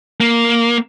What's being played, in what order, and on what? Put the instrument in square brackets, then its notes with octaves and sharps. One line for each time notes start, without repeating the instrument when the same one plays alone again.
[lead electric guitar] A#3